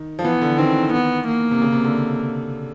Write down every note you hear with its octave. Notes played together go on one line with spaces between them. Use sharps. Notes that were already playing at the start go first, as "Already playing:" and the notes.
Already playing: D#3
F3
E3 B3
D3
D#3 C4
D#3 B3
A#3
C3
C#3
C3
D3